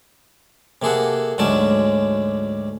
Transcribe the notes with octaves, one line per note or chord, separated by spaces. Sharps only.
C3 A#3 G#4 A4 F#5
D2 G#2 F#3 C#4 D5 A5